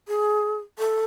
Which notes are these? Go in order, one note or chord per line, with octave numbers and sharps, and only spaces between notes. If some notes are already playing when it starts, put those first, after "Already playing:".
G#4
A4